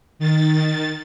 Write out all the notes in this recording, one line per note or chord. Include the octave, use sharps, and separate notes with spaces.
D#3 A6